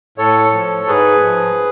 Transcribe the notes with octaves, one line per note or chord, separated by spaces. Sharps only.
A2 A4 C#5
F3
G#2 G#4 B4
F3